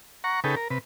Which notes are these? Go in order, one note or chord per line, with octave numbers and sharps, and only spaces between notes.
F#5 A#5 C#6
C#3 D#4 G#4 A4 B4 G5
A#4
C3 B4